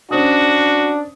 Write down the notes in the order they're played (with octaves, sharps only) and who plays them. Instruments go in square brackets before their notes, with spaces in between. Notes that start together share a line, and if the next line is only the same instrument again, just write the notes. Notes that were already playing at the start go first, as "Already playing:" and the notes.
[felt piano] C#4 C5 D#6 [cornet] D4 [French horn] F#4